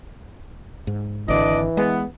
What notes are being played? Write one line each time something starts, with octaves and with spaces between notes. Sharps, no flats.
G#2
G#1 D3 E3 D4 D5 D#5
G#3 B3